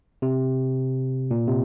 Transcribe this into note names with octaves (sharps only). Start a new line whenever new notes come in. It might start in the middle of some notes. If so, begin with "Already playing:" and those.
C3
A#2
C3